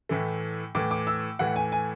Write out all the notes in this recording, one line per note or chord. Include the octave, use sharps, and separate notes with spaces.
A2 E3 A3
A2 E3 A3 D6
D6
E6
A2 E3 A3 F#5
G#5
G#5